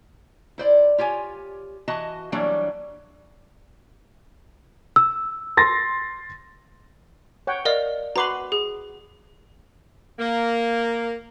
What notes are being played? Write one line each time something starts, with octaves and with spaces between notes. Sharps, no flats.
E4 C5 D5
F4 G4 C#5 G#5
E3 F#4 D#5 A5
E3 F#3 G3 A#3 D4 C#5
E6
C6 A6 A#6
C#5 F#5 G5
A#4 D5 D#5 F5
F#4 B4 A#5 C6 D6 F#7
G#4
A#3